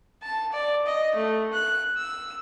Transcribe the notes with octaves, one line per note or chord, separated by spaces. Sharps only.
A5
D5
D#5
A3
F#6
E6